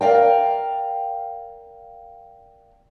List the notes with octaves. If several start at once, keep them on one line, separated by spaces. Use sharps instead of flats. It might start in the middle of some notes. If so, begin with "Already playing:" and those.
A#4 D5 D#5 F5 G5